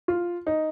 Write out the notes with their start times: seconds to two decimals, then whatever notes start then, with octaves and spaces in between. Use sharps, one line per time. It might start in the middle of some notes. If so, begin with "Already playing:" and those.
0.08 F4
0.47 D#4